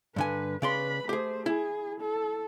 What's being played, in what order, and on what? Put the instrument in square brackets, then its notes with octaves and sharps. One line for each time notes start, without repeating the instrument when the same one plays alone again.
[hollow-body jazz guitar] G2 D3 G#5 [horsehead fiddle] B4
[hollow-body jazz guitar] C#3 D5 C6 [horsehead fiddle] B4 B5
[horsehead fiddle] A3 C5 [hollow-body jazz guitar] G4 G#4
[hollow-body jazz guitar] E4 [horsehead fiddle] G#4
[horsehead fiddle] A4